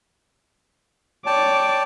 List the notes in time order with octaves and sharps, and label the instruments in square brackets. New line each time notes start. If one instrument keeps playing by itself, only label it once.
[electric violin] C#5 D6 [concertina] D5 G5 A5